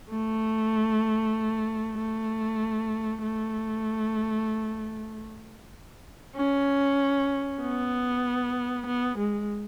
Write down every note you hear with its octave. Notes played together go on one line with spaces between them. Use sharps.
A3
A3
A3
C#4
B3
B3
G#3